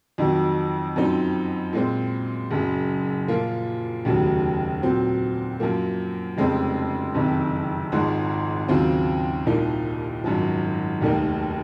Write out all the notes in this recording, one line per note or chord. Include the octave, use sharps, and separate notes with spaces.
F2 D#3 F#3
F#2 F3 C4 D#4
A#2 G#3 C4
F#1 F#2 C#3
A#2 F3 A#3 F4
F1 D#2 C#3 F#3
A#2 F#3 C4
F#2 F3 A#3
F1 F2 C#3 G#3 C4
F#1 F2 C3 D#3
G#1 G#2 F3 G#3
D#2 C#3 F#3 C4 F4
C2 A#2 F3 A#3 D#4
G#1 F#2 F3
F1 D#2 D#3 A#3 D#4